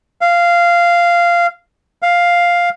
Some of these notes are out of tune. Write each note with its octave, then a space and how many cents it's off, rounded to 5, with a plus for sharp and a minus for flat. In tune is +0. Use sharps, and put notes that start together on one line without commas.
F5 -10
F5 +5